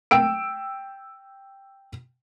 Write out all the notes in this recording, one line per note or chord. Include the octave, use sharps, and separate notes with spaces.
G5 E6 D7